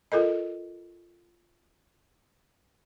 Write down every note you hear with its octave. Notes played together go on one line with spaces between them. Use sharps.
F4 A4 A#4 D#5